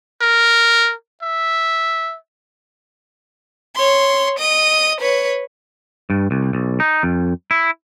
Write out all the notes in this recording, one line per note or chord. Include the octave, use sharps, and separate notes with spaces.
A#4
E5
C#5 C6
D#5 D#7
B4 C#5
G2
C2
B1
D#4
F2
E4